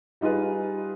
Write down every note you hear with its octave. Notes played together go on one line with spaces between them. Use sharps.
G3 D#4 F4 G#4 B4